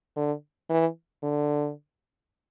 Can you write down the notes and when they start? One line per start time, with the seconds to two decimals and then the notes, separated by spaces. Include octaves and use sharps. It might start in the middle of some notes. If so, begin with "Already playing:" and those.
0.16 D3
0.70 E3
1.23 D3